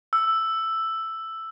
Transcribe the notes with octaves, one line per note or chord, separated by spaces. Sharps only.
E6